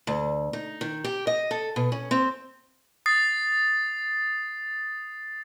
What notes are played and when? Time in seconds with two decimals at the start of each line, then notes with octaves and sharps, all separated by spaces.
0.07 D2
0.53 D#4
0.81 D#3
1.04 G4
1.27 D#5
1.51 A4
1.76 B2
1.92 C#4
2.11 C4
3.06 D#6 A6 C7